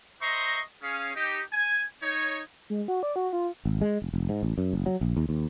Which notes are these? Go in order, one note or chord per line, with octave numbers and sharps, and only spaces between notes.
C5 D#5 E5 A#5 C6 C#6
C#4 G#4 F5
D#4 G4
G#5
D#4 C#5
G#3
F#4
D5
F#4
F4
G#1
G#3
F1
F1
G#2
A1
F#2
F#1
F#3
A#1
D#2
D#2